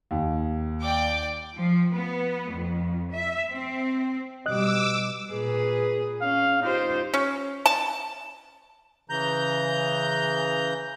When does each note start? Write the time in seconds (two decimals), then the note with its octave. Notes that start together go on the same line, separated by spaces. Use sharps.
0.11 D#2
0.82 D5 G5 D6
1.56 F3
1.93 B3
2.52 F2
3.13 E5
3.51 C4
4.46 B2 G3 D#5 D6 E6 F#6
5.31 A#2 G#4 B4
6.22 C#4 F5
6.62 D#4 F4 G4 C5
7.14 C#4
7.66 A5
9.10 C#3 E3 A#5 G6